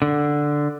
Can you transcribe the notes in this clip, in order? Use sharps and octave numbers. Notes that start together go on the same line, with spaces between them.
D3